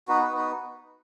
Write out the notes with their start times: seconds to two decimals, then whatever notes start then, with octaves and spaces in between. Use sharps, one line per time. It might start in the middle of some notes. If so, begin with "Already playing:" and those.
0.08 B3 D#4 F#4 B4
0.22 B4
0.37 B4